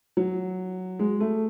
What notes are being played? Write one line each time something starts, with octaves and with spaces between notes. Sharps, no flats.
F#3
G#3
A3